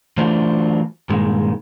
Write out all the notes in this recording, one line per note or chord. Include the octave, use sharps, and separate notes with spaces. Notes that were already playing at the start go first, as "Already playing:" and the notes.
E3 F#3 A3 D4 F4 C5
G2 A#2 D#3 G#3